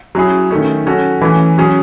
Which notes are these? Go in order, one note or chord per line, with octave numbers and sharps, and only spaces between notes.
F#3 C#4 E4 G#4
D#3 A3 C#4
F#3 C#4 F#4 A4
E3 A3 C#4
F#3 C#4 G#4